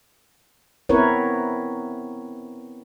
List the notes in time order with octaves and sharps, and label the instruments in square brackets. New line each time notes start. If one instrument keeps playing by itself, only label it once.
[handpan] B3 C4 E4 A#4 B4 C#5